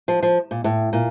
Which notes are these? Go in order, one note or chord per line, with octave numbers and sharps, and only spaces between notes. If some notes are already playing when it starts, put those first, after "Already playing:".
F3
F3
A#2
A2
A#2